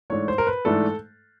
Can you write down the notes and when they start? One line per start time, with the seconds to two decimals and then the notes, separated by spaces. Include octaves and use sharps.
0.10 G#2 E3 A3 D4 C#5
0.28 C5
0.38 A#4
0.47 B4
0.65 G#2 E3 A3 D4 A4